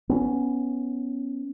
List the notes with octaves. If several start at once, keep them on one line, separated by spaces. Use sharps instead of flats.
B3 C#4